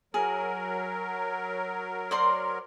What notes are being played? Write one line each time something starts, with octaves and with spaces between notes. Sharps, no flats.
F#3 G#4 A#4
C5 D5 C6